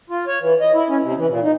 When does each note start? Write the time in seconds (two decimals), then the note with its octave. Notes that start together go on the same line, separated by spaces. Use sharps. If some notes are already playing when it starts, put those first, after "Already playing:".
0.10 F4
0.27 C#5
0.41 E3
0.61 D#5
0.74 E4
0.89 C#4
1.02 C3
1.17 E3
1.28 A#2
1.43 D#4